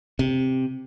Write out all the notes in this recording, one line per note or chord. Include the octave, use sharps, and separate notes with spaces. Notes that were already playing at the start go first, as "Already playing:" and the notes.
C3